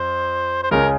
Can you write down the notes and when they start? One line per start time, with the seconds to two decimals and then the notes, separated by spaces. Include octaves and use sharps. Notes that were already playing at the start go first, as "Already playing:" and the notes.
Already playing: F2 C5
0.63 C5
0.71 C#2 C#3 G#3 C#4 A#4